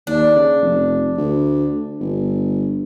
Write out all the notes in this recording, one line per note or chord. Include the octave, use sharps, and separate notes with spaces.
D#2 D4
C#3
F1
D2
G1